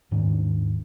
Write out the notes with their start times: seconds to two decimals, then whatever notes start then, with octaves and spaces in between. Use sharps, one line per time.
0.11 D#1 G#2 D#3 D4